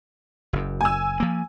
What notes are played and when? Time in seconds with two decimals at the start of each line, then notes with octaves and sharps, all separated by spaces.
0.53 F#1 F#2
0.81 G#5 E6
1.20 F3 A#3